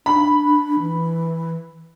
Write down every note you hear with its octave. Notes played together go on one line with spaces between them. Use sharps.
D4 B5
E3